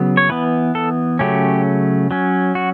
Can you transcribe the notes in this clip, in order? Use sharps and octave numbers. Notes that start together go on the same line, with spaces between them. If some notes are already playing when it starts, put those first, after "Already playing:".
Already playing: C#3 F#3 B3
C#5
E3 B3 B4
A4
C#3 F#3 A3 C#4 G4
F#3 C#4
F#4